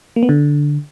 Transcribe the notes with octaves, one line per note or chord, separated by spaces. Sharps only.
A#3
B3
D3